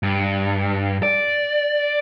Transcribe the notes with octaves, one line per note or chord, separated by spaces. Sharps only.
G2
D5